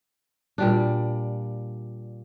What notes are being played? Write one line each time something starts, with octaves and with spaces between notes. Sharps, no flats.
A#2 G3 D4